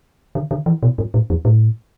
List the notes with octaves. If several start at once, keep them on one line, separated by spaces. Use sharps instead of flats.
D3
D3
E3
B2
G2
A2
F2
A2